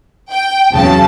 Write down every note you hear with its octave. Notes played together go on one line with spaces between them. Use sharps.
G5
E2 C#3 F#3 A5